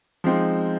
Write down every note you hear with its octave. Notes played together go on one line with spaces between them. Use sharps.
F3 G#3 C4 D#4